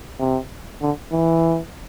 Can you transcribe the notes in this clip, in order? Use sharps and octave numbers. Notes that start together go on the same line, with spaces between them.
C3
D3
E3